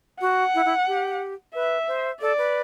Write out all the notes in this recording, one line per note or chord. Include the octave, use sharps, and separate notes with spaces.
F#4 F#5
E4
E4
G4
B4 E5
C5
A4 D5
B4